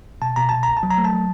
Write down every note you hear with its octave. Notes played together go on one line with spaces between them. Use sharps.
B2 A5
B2 A#5
B2 A5
C2 A#5
A5
F#3
A#5
A3
A5
F#3